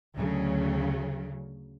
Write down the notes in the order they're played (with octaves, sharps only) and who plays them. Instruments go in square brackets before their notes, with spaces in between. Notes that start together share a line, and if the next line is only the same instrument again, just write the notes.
[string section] D2 C#3 F#3